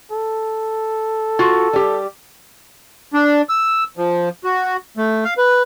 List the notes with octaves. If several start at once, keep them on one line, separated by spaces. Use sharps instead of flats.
A4
F4 F#4
G3 G4
D4
E6
F3
F#4
A3
F5
B4